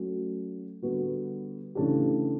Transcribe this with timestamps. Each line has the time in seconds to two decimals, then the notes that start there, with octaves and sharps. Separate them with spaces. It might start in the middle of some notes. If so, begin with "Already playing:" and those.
Already playing: F#3 A3 C#4 F#4
0.83 D3 G3 B3 F#4
1.75 C#3 E3 A3 D4 G4